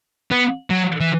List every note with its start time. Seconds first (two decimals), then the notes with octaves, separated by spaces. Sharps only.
0.31 B3
0.70 F#3
1.01 E3